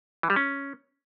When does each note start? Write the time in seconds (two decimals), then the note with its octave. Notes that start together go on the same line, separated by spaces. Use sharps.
0.23 E3
0.30 G3
0.36 C#4